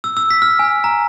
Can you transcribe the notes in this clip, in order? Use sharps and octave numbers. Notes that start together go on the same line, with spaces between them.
E6
E6
B6
F6
G#5
A#5